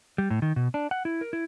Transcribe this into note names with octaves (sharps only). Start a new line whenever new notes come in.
G3
A2
D#3
B2
D4
F#5
E4
A#4
E4